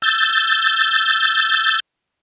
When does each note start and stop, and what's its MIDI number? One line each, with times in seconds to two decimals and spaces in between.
0.02 1.80 88
0.02 1.80 91
0.02 1.80 93